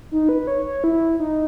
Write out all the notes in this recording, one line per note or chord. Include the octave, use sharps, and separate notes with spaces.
D#4
B4
C#5
C#5
E4
D#4